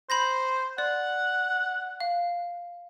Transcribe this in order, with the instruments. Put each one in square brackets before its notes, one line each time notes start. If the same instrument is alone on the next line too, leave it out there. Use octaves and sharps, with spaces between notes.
[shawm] C5 [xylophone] B5 G6 A#6
[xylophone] D5 [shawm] F#5
[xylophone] F5